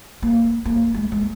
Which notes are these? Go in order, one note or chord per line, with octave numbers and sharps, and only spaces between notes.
A#3
A#3
G#3
G#3